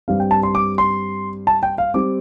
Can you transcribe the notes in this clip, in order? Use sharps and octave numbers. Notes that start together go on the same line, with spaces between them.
G2 G3 C4 F5
G5
A5
C6
D6
C6
A5
G5
F5
G3 C4 D6